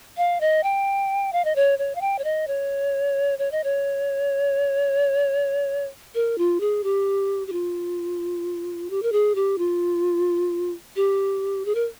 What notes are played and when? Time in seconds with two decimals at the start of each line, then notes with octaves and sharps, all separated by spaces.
0.17 F5
0.41 D#5
0.63 G5
1.33 F5
1.45 D#5
1.56 C#5
1.79 C#5
1.95 F5
2.01 G5
2.19 C#5
2.24 D#5
2.48 C#5
3.39 C#5
3.52 D#5
3.64 C#5
6.15 A#4
6.38 F4
6.60 G#4
6.84 G4
7.47 G4
7.52 F4
8.90 G4
9.03 A#4
9.12 G#4
9.35 G4
9.58 F4
10.96 G4
11.65 G#4
11.75 A#4